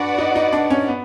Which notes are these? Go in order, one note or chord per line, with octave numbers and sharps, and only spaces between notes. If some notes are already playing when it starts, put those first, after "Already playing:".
Already playing: D4 F#4 B4 D5 F#5
D#4
D#4
D4
C#4
B3